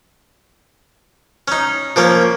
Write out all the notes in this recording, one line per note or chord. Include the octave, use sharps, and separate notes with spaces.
C#4 D#4
F3 A#3 C#4